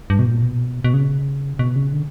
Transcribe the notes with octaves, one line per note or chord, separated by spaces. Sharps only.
G2
B2
A#2
B2
B2
C#3
B2
C#3
D3